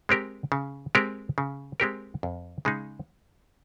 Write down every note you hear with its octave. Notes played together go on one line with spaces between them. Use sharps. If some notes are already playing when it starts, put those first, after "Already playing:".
G#3 C4 G4 A#4
C#3
G#3 C4 G4 A#4
C#3
G#3 C4 G4 A#4
F2
C#3 G#3 D#4 G#4